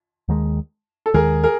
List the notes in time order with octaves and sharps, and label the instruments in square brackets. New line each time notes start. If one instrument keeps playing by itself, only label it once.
[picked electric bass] D#2 D#3 G#3
[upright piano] A4
[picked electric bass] D#2 D#3 G#3 [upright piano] G#4 A#4
[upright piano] G#4 A#4